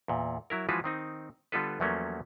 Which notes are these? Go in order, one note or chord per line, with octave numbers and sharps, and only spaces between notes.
E2 A#2
F#3 E4 A#4
E3 F3 G#3 F4 F#4 B4
D#3 C4 D#4
D3 G3 B3 F4 A4 B4
E2 F3 F#3 A3 A#3 C#4